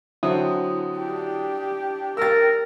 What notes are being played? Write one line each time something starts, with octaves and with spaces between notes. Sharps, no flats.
D3 F#3 C4 E4 D#6
D4 G4
A#4 E6 A6